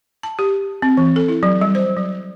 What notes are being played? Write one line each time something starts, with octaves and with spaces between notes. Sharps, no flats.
A5
G4
C4
E3
A4
E4
F#3
G3
C5
F#3